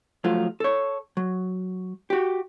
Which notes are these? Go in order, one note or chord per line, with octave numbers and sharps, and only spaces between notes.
F3 F#3 A3 F4
A4 C#5
F#3
F#4 G4